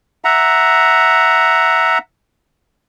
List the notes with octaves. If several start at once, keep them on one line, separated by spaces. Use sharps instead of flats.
E5 F#5 A#5